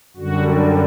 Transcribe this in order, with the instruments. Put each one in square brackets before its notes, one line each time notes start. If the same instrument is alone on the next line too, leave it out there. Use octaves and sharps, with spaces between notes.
[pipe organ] F#2 D3 G3 F#4